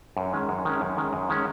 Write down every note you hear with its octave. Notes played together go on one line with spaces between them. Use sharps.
F#2
D#3 G#3 C#4
F#2
D#3 G#3 C#4
F#2
D#3 G#3 C#4
F#2
D#3 G#3 C#4